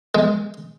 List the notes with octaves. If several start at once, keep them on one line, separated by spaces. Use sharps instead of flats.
G#3